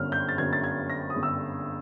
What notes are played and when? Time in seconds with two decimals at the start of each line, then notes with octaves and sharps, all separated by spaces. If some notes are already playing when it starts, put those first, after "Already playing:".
Already playing: G1 F#2 D3 F6
0.12 G6
0.29 A6
0.38 G1 F#2 D3 G#6
0.53 A6
0.64 G#6
0.90 A#6
1.10 D#6
1.15 G1 F#2 D3
1.23 E6